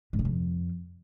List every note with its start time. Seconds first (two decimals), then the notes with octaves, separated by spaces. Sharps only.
0.13 G#2
0.19 C3
0.25 F2